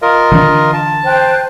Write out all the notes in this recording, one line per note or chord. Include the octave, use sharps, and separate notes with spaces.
F4 A#4 D#5
D3 E3 D4
A5
C5 G5 F#6